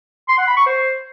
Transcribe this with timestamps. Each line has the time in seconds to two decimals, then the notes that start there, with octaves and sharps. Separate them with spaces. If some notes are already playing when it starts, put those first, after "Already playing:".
0.29 C6
0.38 F#5
0.48 B5
0.57 C#6
0.67 C5